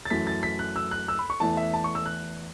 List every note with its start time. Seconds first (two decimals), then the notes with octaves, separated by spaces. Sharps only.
0.05 A6
0.10 F#2 E3 A3 B6
0.27 A6
0.43 B6
0.59 F#6
0.76 E6
0.91 F#6
1.08 E6
1.19 B5
1.30 C#6
1.40 E2 E3 A3 A5
1.57 E5
1.74 A5
1.84 C#6
1.95 E6
2.06 F#6